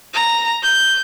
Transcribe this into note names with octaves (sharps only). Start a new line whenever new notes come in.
A#5
G6